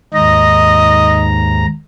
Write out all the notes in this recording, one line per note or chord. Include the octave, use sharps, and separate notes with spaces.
D#2 G#2 D#5 A#5